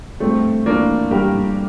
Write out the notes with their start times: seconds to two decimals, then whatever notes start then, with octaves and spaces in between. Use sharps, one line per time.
0.20 G2 A3 C4
0.43 G2
0.66 E3 A#3 D4
0.88 E3
1.11 G2 G4 A#4
1.34 G2